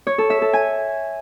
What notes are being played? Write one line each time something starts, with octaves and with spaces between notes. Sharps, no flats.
C#5
A4
E5
A4
G#5